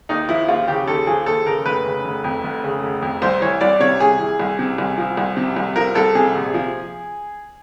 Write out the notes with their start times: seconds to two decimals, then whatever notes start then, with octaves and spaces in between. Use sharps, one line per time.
0.09 D#2 D#4
0.29 F3 E4
0.48 D#2 F4
0.68 C#3 G4
0.87 D#2 A4
1.07 F3 G#4
1.26 D#2 A4
1.46 C#3 A#4
1.66 F1 B4
1.85 C#3
2.05 F1
2.24 F2
2.44 F1
2.64 C#3
2.83 F1
3.02 F2
3.22 C2 C5
3.41 E3 C#5
3.61 C2 D5
3.80 C3 C#5
4.00 C2 G#4
4.19 E3
4.40 C2
4.59 C3
4.78 C2
4.98 F3
5.17 C2
5.37 C3
5.57 C2
5.76 F3 A#4
5.95 C2 A4
6.15 C3 G#4
6.35 A#1
6.54 F3